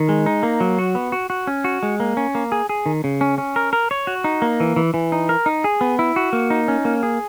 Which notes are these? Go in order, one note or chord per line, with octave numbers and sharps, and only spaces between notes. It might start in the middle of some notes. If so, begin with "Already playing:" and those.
Already playing: D#3
G#3
D#4
A#3
F#3
F#4
B3
F#4
F#4
C#4
F#4
G#3
A#3
C#4
A#3
G#4
G#4
D#3
C#3
C#4
C#4
A#4
A#4
C#5
F#4
D#4
A#3
E3
E3
E3
D#4
A#4
D#4
G#4
B3
E4
F#4
A#3
D#4
C#4
A#3
G#4